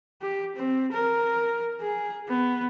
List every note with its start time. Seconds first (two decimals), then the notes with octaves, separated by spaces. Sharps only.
0.22 G4
0.56 C4
0.92 A#4
1.81 G#4
2.28 B3